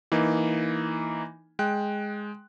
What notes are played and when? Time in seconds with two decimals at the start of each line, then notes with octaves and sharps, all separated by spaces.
0.12 E3 A#3 D#4
1.59 G#3 G5 F#6